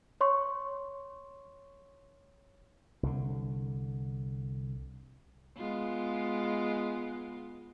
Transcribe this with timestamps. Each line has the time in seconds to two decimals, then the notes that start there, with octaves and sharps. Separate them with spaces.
0.21 C#5 C6 C#6
3.03 C2 D3
5.57 G#3 B3 F4